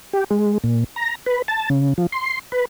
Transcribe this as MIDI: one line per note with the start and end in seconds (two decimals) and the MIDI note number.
0.13 0.24 67
0.31 0.58 56
0.64 0.84 46
0.96 1.15 82
1.26 1.42 71
1.48 1.69 81
1.70 1.94 49
1.98 2.07 53
2.12 2.39 84
2.52 2.65 71